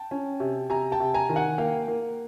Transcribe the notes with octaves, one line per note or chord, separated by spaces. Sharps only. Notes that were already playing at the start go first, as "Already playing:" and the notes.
Already playing: G5 A5
C#4
C3
C3 G#5 A#5
G5 A5
C3
G#5 A#5
D#3
F#5 G#5
A#3 F5 G5
A#3